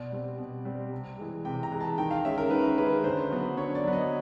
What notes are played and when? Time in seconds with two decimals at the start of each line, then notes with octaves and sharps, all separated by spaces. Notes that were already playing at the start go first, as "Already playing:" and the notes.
Already playing: B2 D5
0.12 G3 C4
0.38 B2
0.65 G3 C4
0.92 C3
1.18 E3 G#3
1.45 C3 G5
1.63 A#5
1.72 E3 G#3
1.80 A5
1.97 D#3 G5
2.11 F5
2.25 G#3 C#4 E5
2.38 A#4
2.51 D#3 B4
2.78 G#3 C#4 B4
3.04 D3 C5
3.31 F#3 B3
3.57 D3 C#5
3.75 D5
3.84 F#3 B3
3.93 D#5